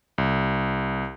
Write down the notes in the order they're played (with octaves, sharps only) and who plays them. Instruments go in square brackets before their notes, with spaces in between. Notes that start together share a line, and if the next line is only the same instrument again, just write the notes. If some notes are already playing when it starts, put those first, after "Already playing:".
[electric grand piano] C2